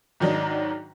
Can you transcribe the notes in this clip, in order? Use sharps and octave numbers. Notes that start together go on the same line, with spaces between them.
G#2 D#3 F#3 D4 D#4